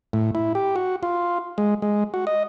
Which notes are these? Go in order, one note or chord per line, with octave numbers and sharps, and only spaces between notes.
A2
E4
G4
F#4
F4
G#3
G#3
F#4
D#5